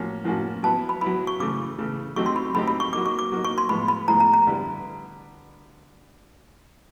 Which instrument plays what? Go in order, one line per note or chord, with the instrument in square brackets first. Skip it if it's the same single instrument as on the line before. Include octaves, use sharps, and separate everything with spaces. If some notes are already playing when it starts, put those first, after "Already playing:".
Already playing: [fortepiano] A2 F3 A#3 C#4 F#4
A2 F3 A#3 C#4 F#4
[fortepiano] F#3 B3 E4 [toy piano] A5
[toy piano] B5
[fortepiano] F#3 B3 E4 [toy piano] B5
[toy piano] C#6
[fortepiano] C#3 E3 A3 [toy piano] D6
[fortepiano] C#3 E3 A3
[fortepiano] F#3 A3 C4 D#4 G4 [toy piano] C#6
[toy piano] C6
B5
[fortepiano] F#3 A3 C4 D#4 G4 [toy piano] B5
[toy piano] B5
C#6
[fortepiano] F#3 A#3 D#4 [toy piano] D6
[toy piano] C#6
D6
[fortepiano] F#3 A#3 D#4
[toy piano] C#6
C6
[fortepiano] A2 F3 G#3 B3 [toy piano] B5
[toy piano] B5
[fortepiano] A2 F3 G#3 B3 [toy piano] A#5
[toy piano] A#5
A#5
[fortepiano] D3 G3 B3 E4 G4